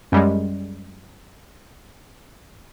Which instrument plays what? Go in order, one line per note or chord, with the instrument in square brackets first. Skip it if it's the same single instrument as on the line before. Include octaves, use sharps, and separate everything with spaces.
[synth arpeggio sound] F#2 G3 G#3